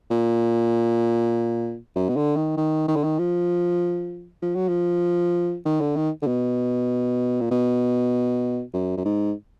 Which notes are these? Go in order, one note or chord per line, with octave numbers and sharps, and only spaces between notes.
A#2
F#2
B2
D3
D#3
D#3
D#3
D3
D#3
F3
F3
F#3
F3
D#3
D3
D#3
D3
B2
A#2
B2
F#2
F#2
G#2